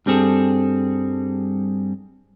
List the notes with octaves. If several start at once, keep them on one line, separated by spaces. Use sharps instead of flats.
G2 G3 C4 G#4 A4